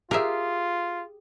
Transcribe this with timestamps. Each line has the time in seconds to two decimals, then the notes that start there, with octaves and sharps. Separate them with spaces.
0.11 F4 G4 G#4 A#4 E5